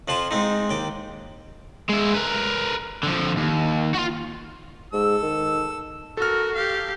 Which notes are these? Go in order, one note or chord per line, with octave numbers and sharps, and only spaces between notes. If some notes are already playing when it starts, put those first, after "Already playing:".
F2 F3 F4 A5
G#2 G#3 C4 D#4
D#2 G5 D6
G#3 E4
A#4 B4
D3 F3
D#2
F4 F#4
G#2 A4 E6
D#3
F#4 A4 A#4 F6
G4 F5